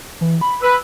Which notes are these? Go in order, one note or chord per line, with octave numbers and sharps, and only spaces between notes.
E3
B5
B4 E6